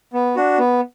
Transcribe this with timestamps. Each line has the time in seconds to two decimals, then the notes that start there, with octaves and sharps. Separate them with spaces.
0.13 B3
0.36 D4 F#4
0.58 B3